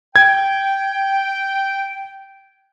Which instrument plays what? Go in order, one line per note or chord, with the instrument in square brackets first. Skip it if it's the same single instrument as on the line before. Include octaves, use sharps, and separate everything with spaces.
[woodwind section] G5 [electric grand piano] G#6